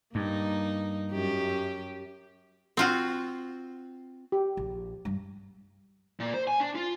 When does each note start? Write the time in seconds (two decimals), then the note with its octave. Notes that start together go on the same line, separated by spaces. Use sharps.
0.15 G2 A#3 D#4
1.12 F#2 G4
2.77 C4 F4 F#4
4.32 G4
4.57 A#1
5.05 G2
6.20 A#2
6.34 C5
6.47 G#5
6.60 D4
6.75 F4